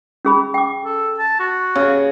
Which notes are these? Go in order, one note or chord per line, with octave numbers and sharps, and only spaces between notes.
C#4 G#4 B5
G5 D6
A4
A5
F#4
C#3